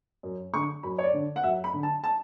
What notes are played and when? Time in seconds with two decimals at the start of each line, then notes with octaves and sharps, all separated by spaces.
0.23 F#2
0.54 D3 C#6
0.83 F#2 B5
0.98 C#5
1.03 D5
1.13 D3
1.36 F#5
1.43 F#2 E5
1.64 B5
1.73 D3
1.83 A5
2.04 A5